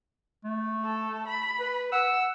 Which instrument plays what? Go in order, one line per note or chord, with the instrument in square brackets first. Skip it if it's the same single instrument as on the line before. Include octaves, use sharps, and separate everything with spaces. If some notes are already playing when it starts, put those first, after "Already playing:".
[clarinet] A3
[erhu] A4
B5
[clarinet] B4
[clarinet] F#5 [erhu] E6